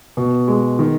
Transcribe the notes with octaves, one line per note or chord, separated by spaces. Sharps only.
B2
G#3
D#3